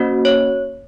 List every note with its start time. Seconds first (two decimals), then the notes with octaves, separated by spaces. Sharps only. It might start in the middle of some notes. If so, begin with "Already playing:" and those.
Already playing: A#3 C#4 F#4 C5
0.25 C#5